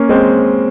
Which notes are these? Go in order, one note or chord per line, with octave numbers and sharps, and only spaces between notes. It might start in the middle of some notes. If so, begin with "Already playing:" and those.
Already playing: A#3 C#4
G#3 C4